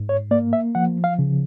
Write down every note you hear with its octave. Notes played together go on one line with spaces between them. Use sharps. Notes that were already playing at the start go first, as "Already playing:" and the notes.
Already playing: G#2
C#5
A#3 D5
E5
F3 F#5
F5
C#3